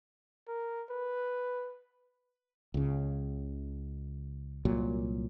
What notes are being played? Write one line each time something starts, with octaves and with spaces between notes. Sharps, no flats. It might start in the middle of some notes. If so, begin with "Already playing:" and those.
A#4
B4
C#2 C#3
C2 A#2 F#3